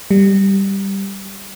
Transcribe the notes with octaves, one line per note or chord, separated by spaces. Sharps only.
G3